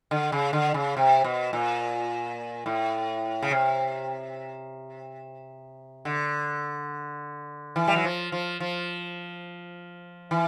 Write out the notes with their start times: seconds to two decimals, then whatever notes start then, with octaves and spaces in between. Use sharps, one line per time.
0.11 D3
0.32 C#3
0.53 D3
0.74 C#3
0.97 C3
1.24 B2
1.53 A#2
2.66 A2
3.42 C#3
3.51 C3
6.05 D3
7.76 E3
7.88 G3
7.96 F#3
8.04 F3
8.32 F3
8.60 F3
10.31 E3